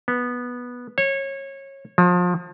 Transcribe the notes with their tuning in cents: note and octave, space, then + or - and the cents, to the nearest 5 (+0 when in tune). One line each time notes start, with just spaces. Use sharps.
B3 -10
C#5 -25
F3 +30